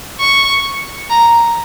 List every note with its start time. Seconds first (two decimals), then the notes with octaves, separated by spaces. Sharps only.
0.21 C#6
1.10 A#5